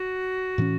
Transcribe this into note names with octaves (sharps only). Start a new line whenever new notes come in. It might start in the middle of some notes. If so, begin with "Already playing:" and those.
Already playing: F#4
A2 E3 C#4